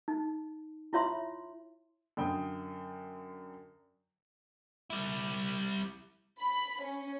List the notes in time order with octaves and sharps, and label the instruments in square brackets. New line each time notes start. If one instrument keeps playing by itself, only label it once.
[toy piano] D#4
E4 F4 C#5 E5 C6
[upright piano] F#2 D3 G5 D#6
[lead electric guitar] G3 E4
[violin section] B5
C#4